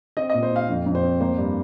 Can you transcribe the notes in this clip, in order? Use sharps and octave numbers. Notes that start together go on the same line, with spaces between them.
C4 D#5
A#2 D#5
C5
C4 F5
F2
F2
C5
C4
A#3 C5
G2